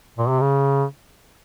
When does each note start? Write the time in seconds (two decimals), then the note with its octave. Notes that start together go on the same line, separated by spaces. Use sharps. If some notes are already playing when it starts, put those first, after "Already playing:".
0.18 A#2
0.29 C3
0.40 C#3